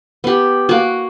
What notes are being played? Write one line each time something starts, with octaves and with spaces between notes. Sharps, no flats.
B3 G4
A#3 F#4